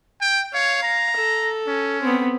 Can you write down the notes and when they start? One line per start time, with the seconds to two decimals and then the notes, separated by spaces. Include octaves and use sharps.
0.21 G5
0.54 C#5 F5
0.83 A#5
1.17 A4
1.67 C#4
2.02 B3 C4